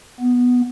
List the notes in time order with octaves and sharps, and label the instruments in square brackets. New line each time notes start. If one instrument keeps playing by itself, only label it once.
[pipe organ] B3